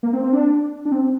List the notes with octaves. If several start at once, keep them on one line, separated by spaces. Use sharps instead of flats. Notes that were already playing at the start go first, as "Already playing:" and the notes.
A#3
C4
C4
D4
D4
C4